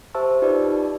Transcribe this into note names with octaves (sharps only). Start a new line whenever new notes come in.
G4 C5 E5 A5 C#6 E6
D#4 F4 G4 B4 D5